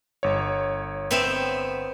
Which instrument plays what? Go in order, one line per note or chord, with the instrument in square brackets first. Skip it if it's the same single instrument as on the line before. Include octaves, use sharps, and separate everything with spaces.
[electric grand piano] G1 C#5
[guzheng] B3 C4 E5